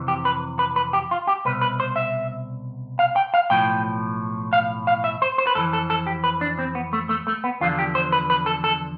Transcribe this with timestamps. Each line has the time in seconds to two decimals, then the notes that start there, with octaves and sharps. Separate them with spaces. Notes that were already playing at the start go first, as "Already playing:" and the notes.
Already playing: F2 C3 E3
0.08 G4
0.25 B4
0.59 B4
0.76 B4
0.93 G4
1.11 F4
1.27 G4
1.45 C2 B2 B4
1.61 B4
1.80 C5
1.96 E5
2.99 F5
3.16 G5
3.34 F5
3.50 B1 A2 F3 G5
4.53 F5
4.87 F5
5.04 E5
5.22 C5
5.38 C5
5.47 B4
5.55 F2 E3 A4
5.73 A4
5.90 A4
6.07 G4
6.24 B4
6.41 D4
6.59 C4
6.75 B3
6.93 A3
7.09 A3
7.27 A3
7.44 B3
7.61 E2 D3 F3 F4
7.79 G4
7.95 C5
8.12 B4
8.30 B4
8.46 A4
8.64 A4